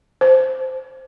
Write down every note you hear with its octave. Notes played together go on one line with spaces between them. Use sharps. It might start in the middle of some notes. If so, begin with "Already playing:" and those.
C5